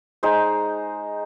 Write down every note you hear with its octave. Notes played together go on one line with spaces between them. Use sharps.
G#3 D#4 C5